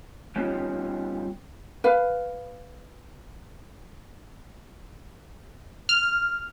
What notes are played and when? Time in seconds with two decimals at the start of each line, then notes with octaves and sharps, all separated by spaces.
0.36 G3 B3 C#4 D#4 F4 G4
1.84 B4 F5
5.89 F6